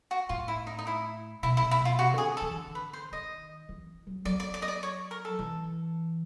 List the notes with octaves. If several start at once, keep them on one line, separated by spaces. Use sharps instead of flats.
F#4
A2 F4
E4
D#4
D#4
E4
B2 E4
E4
B2
E4
B2 F4
C3 F#4
D3 G#4
A4
E3
D3
B4
C5
D#3 D#5
E3
F#3
F#3 D5
D5
D5
D#5
D5
C#5
A#4
A4
E3